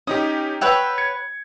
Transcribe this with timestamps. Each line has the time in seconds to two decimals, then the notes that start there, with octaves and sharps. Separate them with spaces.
0.07 C#4 D#4 G4 D#6
0.61 B4 C#5 F#5 G5 E6
0.98 G#6 C#7